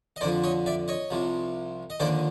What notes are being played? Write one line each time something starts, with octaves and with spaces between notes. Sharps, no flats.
D#5
F2 D3 F3 C5 D5
C#5 D#5
D5 E5
C#5 D#5
C2 C3 F3
D#5
D#2 D3 F3 C5 D5